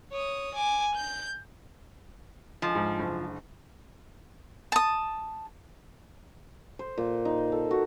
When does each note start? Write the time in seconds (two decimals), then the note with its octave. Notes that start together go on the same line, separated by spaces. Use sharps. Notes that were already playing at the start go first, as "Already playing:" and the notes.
0.12 C#5 D#6
0.54 G#5 D6
0.95 G6
2.62 D3 F3 G#3
2.75 G#2
2.99 F#1
4.72 A5 D#6
6.79 C5
6.98 A#2
7.25 D#4
7.52 A4
7.71 F#4